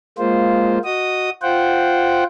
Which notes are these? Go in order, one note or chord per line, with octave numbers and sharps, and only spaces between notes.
G#3 A#3 F4 C5
F#4 D#5 D#6
F4 C5 F#5 G5